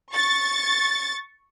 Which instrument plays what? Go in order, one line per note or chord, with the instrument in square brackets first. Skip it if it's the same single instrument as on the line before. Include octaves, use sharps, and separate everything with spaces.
[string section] C#6 A6